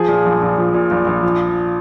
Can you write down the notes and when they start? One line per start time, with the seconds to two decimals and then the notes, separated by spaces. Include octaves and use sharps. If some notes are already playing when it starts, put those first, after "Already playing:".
Already playing: F3 G#4
0.08 A#2
0.25 A#1
0.42 A#1
0.58 F3
0.74 A#2
0.91 A#1
1.07 A#1
1.23 F3